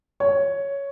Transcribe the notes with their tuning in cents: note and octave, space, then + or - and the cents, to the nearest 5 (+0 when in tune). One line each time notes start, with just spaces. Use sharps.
C#5 +5